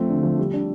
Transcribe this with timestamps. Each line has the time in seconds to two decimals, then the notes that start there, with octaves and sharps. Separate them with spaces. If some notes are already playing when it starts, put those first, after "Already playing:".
Already playing: F3 A3 C4
0.09 D3
0.23 F3
0.39 G3
0.53 D4